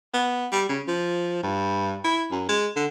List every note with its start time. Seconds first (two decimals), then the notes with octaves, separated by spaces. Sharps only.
0.14 B3
0.52 G3
0.69 C#3
0.88 F3
1.43 G2
2.04 E4
2.31 F#2
2.49 G#3
2.76 D3